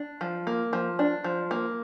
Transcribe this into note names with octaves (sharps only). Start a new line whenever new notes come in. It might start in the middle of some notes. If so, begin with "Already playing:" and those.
Already playing: D4
F3
A#3
F3
D4
F3
A#3